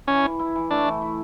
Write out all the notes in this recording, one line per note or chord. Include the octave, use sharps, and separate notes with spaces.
E3 C#4
E3
E4
E3
A3 D4
E3
E4